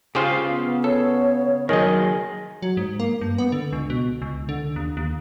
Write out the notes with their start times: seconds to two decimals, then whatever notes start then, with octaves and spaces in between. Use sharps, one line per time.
0.15 C#3 F4 G4 G#4 C5 F5
0.48 B3
0.84 A4 C#5
1.69 D#3 F#3 G#4 A#4 D#5
2.62 F#3
2.77 G#2
3.00 A#3
3.21 G2
3.38 B3
3.52 D3
3.73 C#2
3.90 B2
4.22 C#2
4.49 D3
4.76 D#2
4.97 D#2